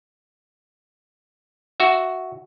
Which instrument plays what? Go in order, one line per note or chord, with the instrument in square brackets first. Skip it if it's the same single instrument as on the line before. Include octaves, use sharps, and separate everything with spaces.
[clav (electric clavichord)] F#4 E5